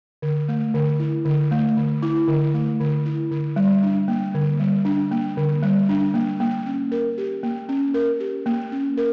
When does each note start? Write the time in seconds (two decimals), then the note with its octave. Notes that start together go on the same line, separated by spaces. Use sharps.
0.22 D3
0.48 A3
0.74 D3
0.99 E4
1.25 D3
1.51 A3
1.77 D3
2.02 E4
2.28 D3
2.54 A3
2.80 D3
3.06 E4
3.31 D3
3.56 G3
3.83 D4
4.08 A#3
4.34 D3
4.60 G3
4.85 D4
5.11 A#3
5.37 D3
5.63 G3
5.89 D4
6.14 A#3
6.40 A#3
6.66 C#4
6.92 A#4
7.18 G4
7.43 A#3
7.69 C#4
7.94 A#4
8.20 G4
8.46 A#3
8.72 C#4
8.97 A#4